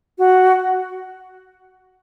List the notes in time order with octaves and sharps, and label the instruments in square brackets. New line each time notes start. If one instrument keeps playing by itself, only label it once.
[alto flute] F#4